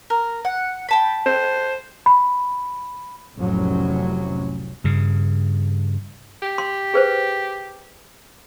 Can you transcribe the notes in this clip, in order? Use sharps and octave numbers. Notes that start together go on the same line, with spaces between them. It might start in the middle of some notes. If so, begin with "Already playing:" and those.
A#4
F#5
G5 A5 B5
C5
B5
F1 C2 A2 C3 F#3 C#4
G2 C#3
G4
C6
G#4 B4 C5